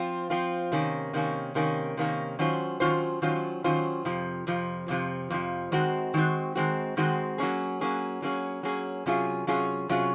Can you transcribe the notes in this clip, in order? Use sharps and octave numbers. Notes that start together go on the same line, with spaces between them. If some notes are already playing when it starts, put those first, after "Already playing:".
Already playing: F3 C4 F4
F3 C4 F4
C3 D#3 A#3 C#4
C3 D#3 A#3 C#4
C3 D#3 A#3 C#4
C3 D#3 A#3 C#4
D#3 F#3 C#4 F4 C5
D#3 F#3 C#4 F4 C5
D#3 F#3 C#4 F4 C5
D#3 F#3 C#4 F4 C5
F2 C3 F3
F2 C3 F3
F2 C3 F3
F2 C3 F3
D#3 G#3 C4 F#4
D#3 G#3 C4 F#4
D#3 G#3 C4 F#4
D#3 G#3 C4 F#4
F#3 A#3 C#4 G#4
F#3 A#3 C#4 G#4
F#3 A#3 C#4 G#4
F#3 A#3 C#4 G#4
C3 F#3 C#4 F4 G#4
C3 F#3 C#4 F4 G#4
C3 F#3 C#4 F4 G#4